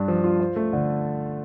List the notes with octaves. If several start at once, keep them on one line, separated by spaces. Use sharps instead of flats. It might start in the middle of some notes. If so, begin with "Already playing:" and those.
Already playing: G2 D4
F3
F4
C5
A3
D3